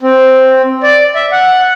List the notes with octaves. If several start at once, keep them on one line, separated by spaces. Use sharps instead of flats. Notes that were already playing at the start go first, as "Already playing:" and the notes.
C4
D5
E5
F#5